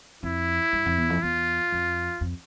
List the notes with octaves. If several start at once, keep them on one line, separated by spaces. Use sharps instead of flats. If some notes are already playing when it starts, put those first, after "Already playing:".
F2 E4
G2
F2
E2
F2
E2 F4
F2
F2